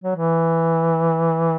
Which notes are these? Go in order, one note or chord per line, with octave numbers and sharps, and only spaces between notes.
F#3
E3